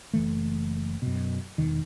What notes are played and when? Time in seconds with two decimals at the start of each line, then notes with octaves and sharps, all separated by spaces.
0.14 F#1 E3 A3
1.02 F#2 B2
1.58 E1 D#3